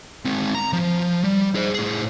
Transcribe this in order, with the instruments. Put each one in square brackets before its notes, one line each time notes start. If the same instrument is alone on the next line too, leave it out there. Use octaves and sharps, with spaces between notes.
[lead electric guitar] G#3 C4
A#5
F3
G3
G#4 C5
A2 G#4